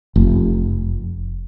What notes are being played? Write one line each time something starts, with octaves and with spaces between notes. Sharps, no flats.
F1